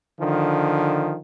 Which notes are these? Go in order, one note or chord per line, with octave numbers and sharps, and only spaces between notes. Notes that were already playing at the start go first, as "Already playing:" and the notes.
D3 D#3 F3